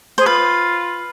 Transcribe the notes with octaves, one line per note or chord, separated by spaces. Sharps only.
G#4 C5
F4 B4